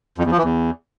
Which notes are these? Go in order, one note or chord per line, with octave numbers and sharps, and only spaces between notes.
F2
E2
F3
E3
E2